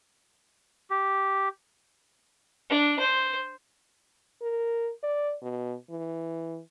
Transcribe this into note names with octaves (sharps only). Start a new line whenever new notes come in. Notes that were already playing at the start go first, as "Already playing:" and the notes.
G4
D4
C5
A#4
D5
B2
E3